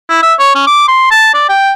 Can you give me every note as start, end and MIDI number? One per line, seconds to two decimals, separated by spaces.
0.09 0.23 64
0.23 0.34 76
0.39 0.52 73
0.55 0.62 61
0.67 0.87 86
0.88 1.10 84
1.11 1.30 81
1.34 1.45 74
1.49 1.73 79